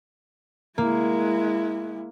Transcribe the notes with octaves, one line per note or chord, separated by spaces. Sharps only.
G#3 A#3 E4